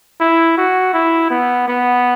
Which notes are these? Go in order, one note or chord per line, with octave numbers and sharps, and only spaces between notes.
E4
F#4
E4
B3
B3